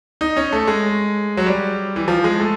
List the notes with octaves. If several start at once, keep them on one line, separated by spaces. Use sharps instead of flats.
D#4
C#4
A3
G#3
F#3
G3
E3
F3
G#3
A3